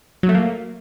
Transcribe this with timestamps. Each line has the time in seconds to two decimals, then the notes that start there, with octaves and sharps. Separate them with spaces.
0.23 F#3
0.29 A3
0.35 A#3